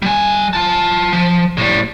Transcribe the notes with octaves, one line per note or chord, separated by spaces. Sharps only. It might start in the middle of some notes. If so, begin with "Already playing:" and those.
G3 G#5
F4 A5
F3
A2 G3